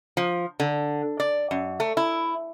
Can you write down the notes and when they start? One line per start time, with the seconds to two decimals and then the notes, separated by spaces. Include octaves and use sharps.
0.17 F3
0.60 D3
1.20 D5
1.51 F#2
1.80 A3
1.97 E4